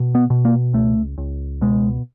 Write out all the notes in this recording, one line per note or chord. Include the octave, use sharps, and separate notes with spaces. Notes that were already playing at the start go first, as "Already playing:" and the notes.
Already playing: B2
B3
B2
A#3
C#2 A3
C#2
B2 G#3